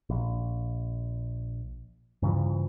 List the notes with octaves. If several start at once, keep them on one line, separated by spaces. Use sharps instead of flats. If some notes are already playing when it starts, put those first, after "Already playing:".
A#1
G2 C#3 E3 F3